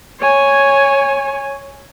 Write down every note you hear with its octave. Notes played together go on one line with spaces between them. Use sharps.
C#5 G#5